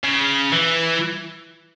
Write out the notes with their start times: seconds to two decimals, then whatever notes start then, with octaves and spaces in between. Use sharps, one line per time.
0.04 C#3
0.53 E3